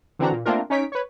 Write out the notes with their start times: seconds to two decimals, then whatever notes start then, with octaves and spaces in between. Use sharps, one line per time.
0.19 D3 E3 C4 D4 F#4 A#5
0.32 A#2
0.45 A3 A#3 C4 D4 F4 A#4
0.70 C#4 D#4 C#5 B6 D7
0.92 B4 C#5